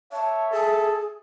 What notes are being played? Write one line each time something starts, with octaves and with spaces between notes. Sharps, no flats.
C#5 E5 A5
G#4 A4